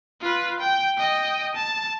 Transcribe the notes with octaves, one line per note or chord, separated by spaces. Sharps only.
F4 B4
G5
D#5 G5
A5